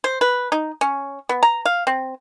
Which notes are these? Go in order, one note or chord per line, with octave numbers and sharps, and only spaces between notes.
C5
B4
D#4
C#4
B3
A#5
F5
C4